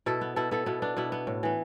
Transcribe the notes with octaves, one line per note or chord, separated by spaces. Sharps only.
B2 E4 A4
B3
B2 E4 A4
B3 E4 A4
B2 B3 E4
B3 D4
B2 B3 E4
B3
A2
E3 B3